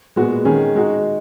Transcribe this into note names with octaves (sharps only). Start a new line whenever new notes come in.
A#2 G#3 B3 F#4
D#3 G#3 C#4 G#4
G#3 D#4 F#4